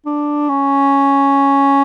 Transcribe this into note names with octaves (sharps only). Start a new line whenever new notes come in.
D4
C#4